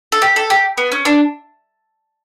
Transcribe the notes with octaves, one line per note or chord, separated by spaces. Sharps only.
A4
G4
A4
G4
B3
C#4
D4